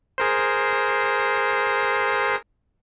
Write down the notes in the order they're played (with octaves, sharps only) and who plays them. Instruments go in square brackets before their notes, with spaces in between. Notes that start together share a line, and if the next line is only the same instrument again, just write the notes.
[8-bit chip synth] G#4 A#4 C5